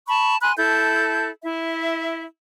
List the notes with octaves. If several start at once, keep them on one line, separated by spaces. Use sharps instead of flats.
A5 B5 C#6
G#5 B5 C6 F#6
E4 A4 A5 G6
E4 E5